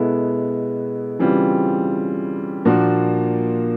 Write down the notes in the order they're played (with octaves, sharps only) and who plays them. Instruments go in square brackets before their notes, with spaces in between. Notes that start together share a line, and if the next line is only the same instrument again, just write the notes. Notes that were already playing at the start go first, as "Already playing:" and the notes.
Already playing: [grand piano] B2 G#3 B3 E4 A4
C#3 E3 G3 C4 F4
A#2 F3 A#3 D4 F#4